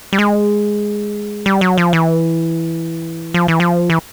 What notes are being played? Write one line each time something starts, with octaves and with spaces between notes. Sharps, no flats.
G3
G#3
G3
F#3
F3
E3
F3
E3
F3
E3